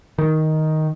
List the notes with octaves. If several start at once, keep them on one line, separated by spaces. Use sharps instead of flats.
D#3